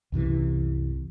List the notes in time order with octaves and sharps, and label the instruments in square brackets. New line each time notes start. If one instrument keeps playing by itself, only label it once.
[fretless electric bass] C2 F#2 C3 E3